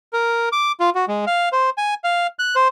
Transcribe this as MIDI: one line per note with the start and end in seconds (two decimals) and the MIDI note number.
0.13 0.49 70
0.52 0.72 86
0.80 0.90 65
0.95 1.05 66
1.08 1.25 56
1.27 1.49 77
1.52 1.70 72
1.78 1.94 80
2.04 2.27 77
2.39 2.55 90
2.56 2.68 72